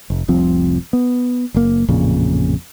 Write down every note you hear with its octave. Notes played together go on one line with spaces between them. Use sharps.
F1
F1 C2 F3 C4
B3
F#1 A#3
A1 F2 A#2 C#3